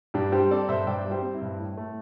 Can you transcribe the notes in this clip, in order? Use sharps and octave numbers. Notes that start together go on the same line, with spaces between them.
G2 D4 G4
G3 G4 C5
C4 A4 D5
G2 C5 E5
G2 D5 G5
G3
G4 C5
C4
C4 E4
G2
A2
A3